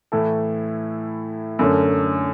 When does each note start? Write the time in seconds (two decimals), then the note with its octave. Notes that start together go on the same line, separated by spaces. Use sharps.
0.12 A2 E3 A3 E4 A4
1.59 F#2 D3 A3 C#4